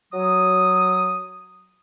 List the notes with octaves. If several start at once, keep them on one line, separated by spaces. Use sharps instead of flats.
F#3 D#6